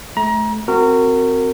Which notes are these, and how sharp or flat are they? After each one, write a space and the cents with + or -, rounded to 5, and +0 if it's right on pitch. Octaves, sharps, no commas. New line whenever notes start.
A3 -25 A#5 +25
C4 +0 F#4 +0 A#4 -25